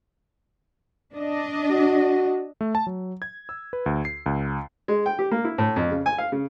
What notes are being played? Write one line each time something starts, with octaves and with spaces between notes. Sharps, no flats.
D4 D#5
F#4
A3
A5
F#3
G#6
E6
B4
D2
C7
C#2
G#3
G5
G4
A#3
E4
A2
F2
C#3
G#5
F5
C#3